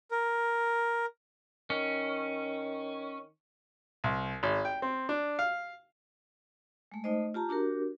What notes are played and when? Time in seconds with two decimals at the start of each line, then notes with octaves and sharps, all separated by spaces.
0.11 A#4
1.70 D#3 C#4
4.04 C2
4.43 G#1
4.65 G5
4.82 C4
5.09 D4
5.39 F5
6.92 G#3 A3
7.04 A3 D#4 C5 D#5
7.34 F4 G4 A5 A#5
7.49 D4 F#4 G4 A#4